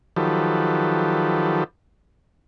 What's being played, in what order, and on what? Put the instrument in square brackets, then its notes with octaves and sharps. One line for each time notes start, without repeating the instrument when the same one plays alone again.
[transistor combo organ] D#3 F3 F#3 G4 A4 B4